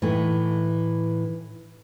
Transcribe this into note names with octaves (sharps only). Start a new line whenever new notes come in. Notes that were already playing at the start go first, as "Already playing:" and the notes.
A2 E3 A3 D#4